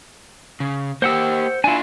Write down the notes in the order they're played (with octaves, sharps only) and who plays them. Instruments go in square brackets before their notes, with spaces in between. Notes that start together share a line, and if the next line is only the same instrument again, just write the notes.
[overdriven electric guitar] C#3
[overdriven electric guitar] A#3 G4 [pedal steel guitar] C5 F#5 E6
[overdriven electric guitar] D4 F4 [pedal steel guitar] E4 G#5